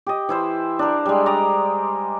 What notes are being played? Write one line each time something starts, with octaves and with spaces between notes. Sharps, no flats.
G4 D#5
E3 E4 C5
D4 A#4
G3 G#3
D5 D#5 A#5